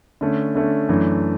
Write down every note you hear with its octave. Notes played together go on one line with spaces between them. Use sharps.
D3 A3 C#4
D3 A3 C#4
F#2 E3 A3 D4